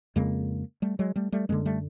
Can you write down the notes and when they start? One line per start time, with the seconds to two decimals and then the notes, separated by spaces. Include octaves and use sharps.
0.16 F2 C#3 G#3 A#3
0.82 G3 A3
0.99 F#3 G#3
1.16 G3 A3
1.32 G3 A3
1.49 F#2 D3 G#3 A#3
1.65 G3 A3